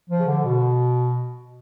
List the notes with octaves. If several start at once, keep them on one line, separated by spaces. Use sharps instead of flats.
F3
C#3
D3
B2